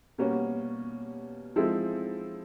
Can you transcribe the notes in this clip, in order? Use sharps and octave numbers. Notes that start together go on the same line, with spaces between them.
B2 G3 A#3 C#4 F#4
F3 G#3 C4 E4 A4